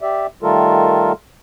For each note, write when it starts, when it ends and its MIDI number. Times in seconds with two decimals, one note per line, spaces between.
0.01 0.27 67
0.01 0.27 74
0.01 0.27 76
0.43 1.12 51
0.43 1.12 55
0.43 1.12 57
0.43 1.12 65
0.43 1.12 69
0.43 1.12 70